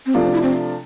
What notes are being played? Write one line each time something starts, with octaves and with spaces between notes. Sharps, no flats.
C4
C3 F3 A3 B3 D4 F4
C4
E4
C4